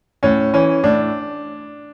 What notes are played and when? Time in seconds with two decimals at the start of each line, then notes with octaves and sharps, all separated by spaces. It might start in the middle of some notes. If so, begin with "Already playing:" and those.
0.23 A2 C#4
0.53 E3 C#4
0.84 A2 D4